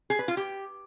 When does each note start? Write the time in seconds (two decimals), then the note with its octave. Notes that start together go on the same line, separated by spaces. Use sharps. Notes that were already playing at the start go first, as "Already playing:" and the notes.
0.10 G#4
0.19 B4
0.28 F4
0.37 G4